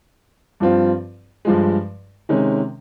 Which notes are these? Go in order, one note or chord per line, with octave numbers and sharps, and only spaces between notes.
G2 F3 C4 F4
G2 F3 G#3
C3 D#3 G#3 C#4